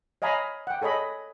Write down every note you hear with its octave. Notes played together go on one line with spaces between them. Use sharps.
C#5 D#5 F5 G#5 A#5 B5
F#5 G5
G#4 A4 C#5 D#5 B5